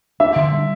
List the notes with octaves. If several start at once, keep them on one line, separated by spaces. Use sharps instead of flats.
D4 E5
D3
G3